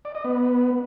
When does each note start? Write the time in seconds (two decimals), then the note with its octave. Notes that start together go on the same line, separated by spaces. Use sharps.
0.05 D5
0.15 D#5
0.24 B3